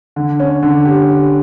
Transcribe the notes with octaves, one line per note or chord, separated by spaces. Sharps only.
D3
C#4
D3
G4